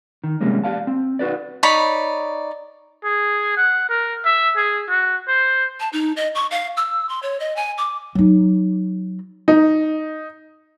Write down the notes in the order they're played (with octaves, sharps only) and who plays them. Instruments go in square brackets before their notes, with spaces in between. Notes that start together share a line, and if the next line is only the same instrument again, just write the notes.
[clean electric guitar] D#3
C3 F3 G3 G#3 A#3 C#4
G4 G#4 D5 F5 A5
C4
D#4 F#4 G4 B4 D5
[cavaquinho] D#4 C#5 D5 B5
[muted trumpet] G#4
F#5
A#4
E5
G#4
F#4
C5
[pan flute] A5
D#4
D#5
C#6
F5
E6
C6
C#5
D#5
G#5
D6
[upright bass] F#3 D#4
[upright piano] D#4